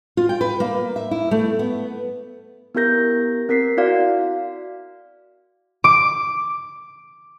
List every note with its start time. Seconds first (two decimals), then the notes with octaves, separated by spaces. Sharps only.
0.17 F4
0.29 G5
0.41 B4
0.60 A#3
0.96 E5
1.11 E4
1.31 A3
1.59 B3
2.75 B3 E4 G4 A#4 G6 A#6
3.49 C4 A#4 B6 C7
3.77 E4 F#4 D5 F5
5.84 D6